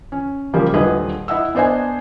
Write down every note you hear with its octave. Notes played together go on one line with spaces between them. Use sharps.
C#4
C#3 F3 G3 A#3 G4
D#1 D3 G#4 B4 D#5 D#6
E4 D#5 E5 F#5 E6
B3 D4 C5 D#5 G#5